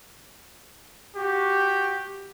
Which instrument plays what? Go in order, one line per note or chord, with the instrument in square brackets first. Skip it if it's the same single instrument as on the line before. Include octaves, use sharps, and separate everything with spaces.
[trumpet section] F#4 G4